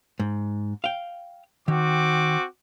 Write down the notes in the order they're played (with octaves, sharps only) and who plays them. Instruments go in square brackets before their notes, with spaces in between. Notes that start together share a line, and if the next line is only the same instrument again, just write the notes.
[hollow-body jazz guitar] G#2
F5 G5
[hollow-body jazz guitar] D#3 [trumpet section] C4 F#4 D6